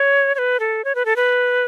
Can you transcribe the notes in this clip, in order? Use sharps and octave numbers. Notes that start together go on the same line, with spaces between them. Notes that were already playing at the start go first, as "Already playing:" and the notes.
Already playing: C#5
C#5
B4
A4
C#5
B4
A4
B4